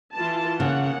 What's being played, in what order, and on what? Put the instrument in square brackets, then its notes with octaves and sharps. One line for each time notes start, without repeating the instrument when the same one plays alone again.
[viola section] E3 F4 A5
[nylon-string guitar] C#3 [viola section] A#3 F#5